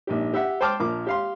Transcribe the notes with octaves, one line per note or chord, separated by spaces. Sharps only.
A#1 G#2 G4
G4 E5 F#5
C5 G5 A5 C6 D6 F6
A#1 F3 A#3 D6
G4 F5 C6